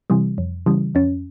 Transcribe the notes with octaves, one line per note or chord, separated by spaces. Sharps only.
C3 E3 G3
F2
C#3 E3 G3
F2 C#4